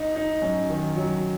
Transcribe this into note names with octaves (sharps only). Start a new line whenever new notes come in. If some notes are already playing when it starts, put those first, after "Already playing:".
Already playing: D#4
D#4
F#2
D#3
F#3